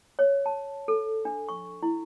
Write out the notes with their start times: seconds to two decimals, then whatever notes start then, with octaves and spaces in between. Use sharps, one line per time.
0.19 C#5
0.46 A5
0.88 A4
1.25 D4
1.49 C#6
1.83 E4